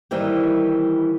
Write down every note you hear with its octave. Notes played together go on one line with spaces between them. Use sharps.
D#3 E3 G3 A#3 C4